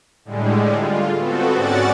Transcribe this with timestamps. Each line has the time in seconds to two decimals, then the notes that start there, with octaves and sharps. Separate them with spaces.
0.25 A2 D3 G3 G#3
0.77 F4
1.17 B3 C4 F#4 A4
1.52 G#2 C#4 F#4 D5 F#5 A6